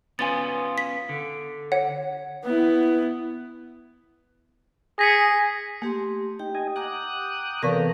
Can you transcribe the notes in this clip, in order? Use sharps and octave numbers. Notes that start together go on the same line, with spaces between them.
B3 C#4 F4 G#5 A6
B6
D3
C#5 F#5
B3 E4
G#4 A#6 B6 C#7
A3 A#3 G4 C6
D#4 G4 G5
D#5 G#5
F#5 G5 A#5 D6 D#6 F#6
C3 E3 B3 A4 A#4 F5 A5 A#5